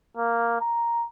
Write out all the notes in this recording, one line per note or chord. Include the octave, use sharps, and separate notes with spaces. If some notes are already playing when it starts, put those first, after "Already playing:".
A#3
A#5